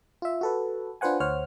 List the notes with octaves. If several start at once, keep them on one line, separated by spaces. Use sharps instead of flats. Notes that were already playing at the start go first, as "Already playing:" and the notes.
F4 E5
F#4 A4 B4
D4 F4 B4 C5 F#5 G#5
D2 C5 C#5 F#5 F6